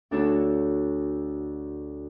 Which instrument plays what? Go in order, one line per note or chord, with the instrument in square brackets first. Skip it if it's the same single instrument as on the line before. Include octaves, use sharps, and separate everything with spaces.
[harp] D2 D4 F#4 A4 C#5